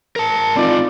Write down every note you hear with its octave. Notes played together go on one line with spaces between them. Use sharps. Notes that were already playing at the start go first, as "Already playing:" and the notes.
A#4 A5
C4 D#4 F4 D5